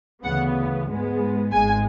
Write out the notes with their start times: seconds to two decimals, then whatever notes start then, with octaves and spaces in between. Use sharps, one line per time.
0.24 D2 C#3 E3 B3 F#5
0.88 G#2 G#3 B3
1.52 G#1 G#2 G#3 G#5